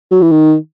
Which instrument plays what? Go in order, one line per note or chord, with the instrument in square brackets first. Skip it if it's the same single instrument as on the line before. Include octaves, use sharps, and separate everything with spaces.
[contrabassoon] F#3
E3
D#3